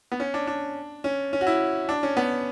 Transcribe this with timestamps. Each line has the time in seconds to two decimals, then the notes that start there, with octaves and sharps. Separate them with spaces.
0.12 B3
0.20 C#4
0.34 D4
0.47 D4
1.04 C#4
1.33 C#4
1.41 F#4
1.47 E4
1.89 D4
2.03 C#4
2.17 B3